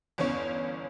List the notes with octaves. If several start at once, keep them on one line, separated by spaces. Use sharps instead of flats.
G1 E2 C#4 C#5